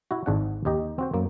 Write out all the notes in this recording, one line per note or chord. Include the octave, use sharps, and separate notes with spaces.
E4 F#4
G#1 G#2 D4 F#5
D#2 D#4 G4 D#5
C4 F#4 C5
F#2 A#3